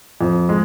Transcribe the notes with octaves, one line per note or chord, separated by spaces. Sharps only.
F2
G#3